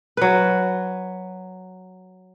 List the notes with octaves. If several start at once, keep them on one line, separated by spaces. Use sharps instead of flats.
F#3 B4